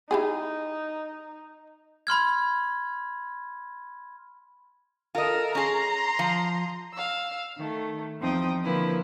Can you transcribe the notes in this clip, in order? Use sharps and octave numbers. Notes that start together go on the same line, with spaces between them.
D#4 E4 G4 G#4
B5 C6 F6 G#6
F4 A4 A#4 D#5
C#4 G#4 A#5 C6
F3
F5 E6
D#3 A3
E2 F3 C4 D#4 G5 D#6
D3 F3 A#3 E4 B4